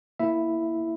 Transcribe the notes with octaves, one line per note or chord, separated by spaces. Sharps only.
A#3 E4 E5